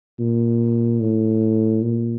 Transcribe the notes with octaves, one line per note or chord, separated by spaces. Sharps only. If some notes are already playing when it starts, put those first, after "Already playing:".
A#2
A2
A#2